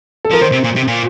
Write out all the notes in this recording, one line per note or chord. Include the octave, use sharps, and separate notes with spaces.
A4
F3 A#4
D#3 C5
C3
A#2
C3
A#2